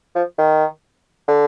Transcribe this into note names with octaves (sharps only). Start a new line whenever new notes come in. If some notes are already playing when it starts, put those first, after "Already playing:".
F3
D#3
D3